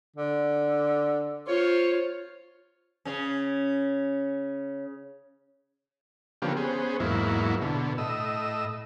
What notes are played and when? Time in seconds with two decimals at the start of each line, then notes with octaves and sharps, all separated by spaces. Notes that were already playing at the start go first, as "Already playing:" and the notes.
0.16 D3
1.48 F4 C5 C#5
3.05 C#3 C#4
6.42 D3 F3 A#3 B3 C#4 G4
6.57 B3 C#4 G#4 C5
7.00 E2 G#2 F#3 A#3 E4
7.62 B2 D3
7.98 A2 D#5 E6